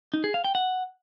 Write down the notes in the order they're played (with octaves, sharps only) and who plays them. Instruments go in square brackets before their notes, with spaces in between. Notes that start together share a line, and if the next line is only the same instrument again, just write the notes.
[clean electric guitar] D#4
G#4
F5
G5
F#5